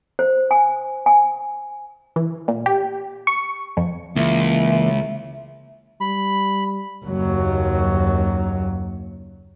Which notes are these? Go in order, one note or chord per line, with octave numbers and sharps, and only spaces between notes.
C5
G#5
G#5
E3
A#2
G4
C#6
F2
C#2 E3 A#3 E5
G3 B5
F#1 D#2 F#3